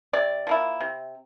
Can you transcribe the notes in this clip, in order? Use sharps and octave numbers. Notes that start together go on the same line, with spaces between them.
C3 D5
F3 A#3 E4
C3